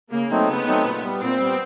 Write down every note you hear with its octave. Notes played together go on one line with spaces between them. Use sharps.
C#3 A#3
F#3 A3 C4 D#4
C#3 B3
F#3 A3 C4 D#4
A#2
G3 B3
A#2 C4
G3 B3